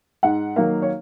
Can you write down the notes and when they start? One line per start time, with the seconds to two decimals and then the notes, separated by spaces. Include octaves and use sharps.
0.23 G#2 F#5
0.56 D#3 F#3 A#3 F5
0.82 C#5